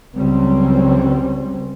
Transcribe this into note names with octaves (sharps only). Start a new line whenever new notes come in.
C#2 F#3 G3 C4 C#4